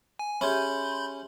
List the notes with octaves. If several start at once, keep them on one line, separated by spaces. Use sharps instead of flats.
G#5
C#4 G4 G#4 E5 B5 C6 G6